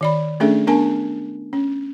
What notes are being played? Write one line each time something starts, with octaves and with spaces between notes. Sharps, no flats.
D#3 D5 B5
A3 C#4 D4 G#4 A4 E5
B3 D4 A#4 G#5 A5
C#4